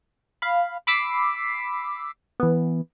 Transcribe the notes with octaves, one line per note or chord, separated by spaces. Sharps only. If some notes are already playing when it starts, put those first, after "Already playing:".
F5 B5
B5 D6 E6 B6 C7
E3 B3